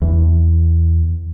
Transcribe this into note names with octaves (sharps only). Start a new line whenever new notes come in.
E2